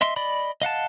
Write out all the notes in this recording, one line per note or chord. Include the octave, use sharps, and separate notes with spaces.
D#5 E5 C6
D5 D#5 B5
D#5 F5 F#5 A5